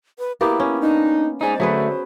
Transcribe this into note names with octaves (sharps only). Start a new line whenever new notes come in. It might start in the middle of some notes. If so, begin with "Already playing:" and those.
B4
A#3 B3 E4 G4
C#4
D4 D#4
G#3 D#4 G#4 C5 D5
D3 F#3 A3 G#4 B4